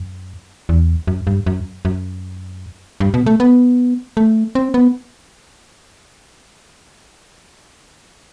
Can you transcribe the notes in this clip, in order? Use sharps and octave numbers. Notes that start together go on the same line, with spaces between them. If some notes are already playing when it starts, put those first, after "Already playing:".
Already playing: F#2
E2
F#2
G2
F#2
F#2
G2
B2
A3
B3
A3
C4
B3